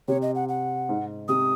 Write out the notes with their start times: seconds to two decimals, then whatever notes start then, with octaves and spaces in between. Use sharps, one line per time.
0.08 C3 C#5
0.22 D#5
0.35 F#5
0.49 F#5
0.89 G#2
1.28 C3 D#6